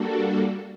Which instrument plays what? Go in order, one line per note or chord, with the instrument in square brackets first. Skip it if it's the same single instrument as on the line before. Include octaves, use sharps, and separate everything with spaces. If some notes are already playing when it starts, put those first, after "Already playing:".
Already playing: [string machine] G3 A#3 D4 F#4 A4